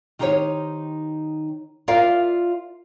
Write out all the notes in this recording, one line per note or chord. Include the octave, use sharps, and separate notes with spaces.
D#3 D#4 G4 C5 C#5
F4 A#4 D5 E5 F5